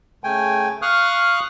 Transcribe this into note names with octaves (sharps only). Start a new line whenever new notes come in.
C#3 A3 G5 G#5
F5 C#6 D#6 F6 F#6